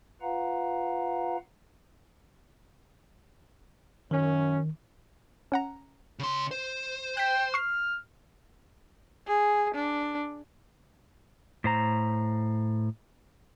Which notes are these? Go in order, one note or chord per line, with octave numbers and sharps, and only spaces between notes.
F4 B4 F5 F#5 A#5
F#2 D#3 C#4
C#4 F#5 A#5
C#3 C6
C5
G5 F#6 B6
C#6 F6 C7
G#4
D4
A2 C5 A#5